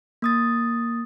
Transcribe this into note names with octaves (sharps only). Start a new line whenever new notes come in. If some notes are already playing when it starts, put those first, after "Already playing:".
A#3 D#6 A6